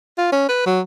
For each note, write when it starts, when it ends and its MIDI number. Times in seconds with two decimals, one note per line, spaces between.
0.18 0.30 65
0.32 0.47 61
0.49 0.62 71
0.66 0.81 54